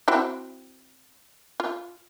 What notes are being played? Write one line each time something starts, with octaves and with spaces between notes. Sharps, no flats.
C4 E4 F#4
F4